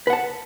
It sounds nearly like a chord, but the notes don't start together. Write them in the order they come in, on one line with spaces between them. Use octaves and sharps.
B4 F#5 A5